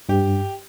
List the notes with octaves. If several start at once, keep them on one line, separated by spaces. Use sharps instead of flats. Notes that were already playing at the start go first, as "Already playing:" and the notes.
G2 G4